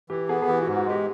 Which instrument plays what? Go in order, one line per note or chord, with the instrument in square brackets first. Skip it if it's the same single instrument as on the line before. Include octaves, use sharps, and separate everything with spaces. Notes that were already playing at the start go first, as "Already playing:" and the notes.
[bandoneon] E3 [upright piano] G4
[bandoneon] B3 [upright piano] G#4
[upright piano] G#4
[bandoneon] E3 [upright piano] G4
[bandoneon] G#2 [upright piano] F#4
[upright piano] F#4
[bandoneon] G#3 [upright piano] G4